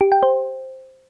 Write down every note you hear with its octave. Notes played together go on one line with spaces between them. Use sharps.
G4
G5
C5